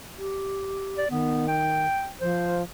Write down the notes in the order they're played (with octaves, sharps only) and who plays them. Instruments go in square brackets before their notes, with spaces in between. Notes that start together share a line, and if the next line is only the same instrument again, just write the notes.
[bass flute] G4
[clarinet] D5
[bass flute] D#3 [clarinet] B3
[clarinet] G5
[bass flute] F3 [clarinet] C5